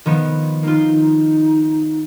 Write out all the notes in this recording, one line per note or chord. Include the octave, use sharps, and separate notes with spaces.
D#3 F3 B3
A#3 D#4 F4